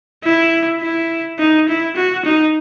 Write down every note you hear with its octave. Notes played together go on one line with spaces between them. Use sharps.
E4
E4
D#4
E4
F#4
D#4